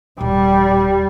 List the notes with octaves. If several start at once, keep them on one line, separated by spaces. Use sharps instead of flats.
D#1 G3